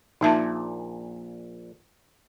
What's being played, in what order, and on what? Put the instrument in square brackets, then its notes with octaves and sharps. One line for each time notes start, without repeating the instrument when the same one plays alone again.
[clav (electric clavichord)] A#1 A#2 [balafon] D#4 E5 A5